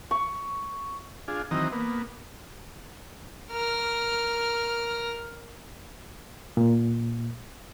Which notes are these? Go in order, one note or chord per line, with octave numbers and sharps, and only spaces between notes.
C#6
D4 F4 G#4
D#3 E3 F#3 C4 D#5 A#5
A#3 B3
A#4 F6
A#2